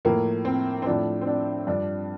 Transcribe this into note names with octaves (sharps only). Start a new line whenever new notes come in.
A2 F3 A#3
C4
C4
A2 F3 D4
C4
D4
G2 F3 D4